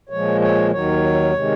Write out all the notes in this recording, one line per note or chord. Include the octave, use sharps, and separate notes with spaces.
A#2 F3 G#3 C#5
C#5
D#2 D#3 F#3 C#5
C3 D#3 G#3